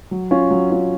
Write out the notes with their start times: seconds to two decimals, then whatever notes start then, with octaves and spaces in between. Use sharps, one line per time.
0.11 F#3
0.31 C#4 F4
0.51 F#3
0.70 C#4 F4